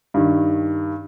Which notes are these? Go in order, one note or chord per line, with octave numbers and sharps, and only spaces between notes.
G2 D#3